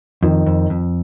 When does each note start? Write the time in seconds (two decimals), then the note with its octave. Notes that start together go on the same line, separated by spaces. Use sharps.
0.23 F2 D#3
0.46 F2
0.70 F2